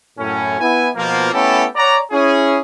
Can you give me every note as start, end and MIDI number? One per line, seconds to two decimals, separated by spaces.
0.19 0.59 42
0.19 0.59 45
0.19 0.59 61
0.60 0.89 59
0.60 0.89 64
0.60 0.89 80
0.96 1.31 47
0.96 1.31 53
0.96 1.31 58
1.33 1.65 57
1.33 1.65 59
1.33 1.65 61
1.33 1.65 64
1.33 1.65 67
1.33 1.65 69
1.76 1.98 73
1.76 1.98 74
1.76 1.98 78
1.76 1.98 82
2.11 2.59 61
2.11 2.59 64
2.11 2.59 68